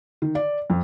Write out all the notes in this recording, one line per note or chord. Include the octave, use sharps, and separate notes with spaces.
D#3
D5
F2